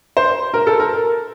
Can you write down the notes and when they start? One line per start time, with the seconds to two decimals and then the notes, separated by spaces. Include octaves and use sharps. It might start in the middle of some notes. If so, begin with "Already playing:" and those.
0.17 C5
0.54 A#4
0.67 A4
0.80 A#4